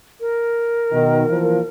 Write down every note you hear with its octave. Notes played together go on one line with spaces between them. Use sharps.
A#4
B2 D#3
E3 F3 A#3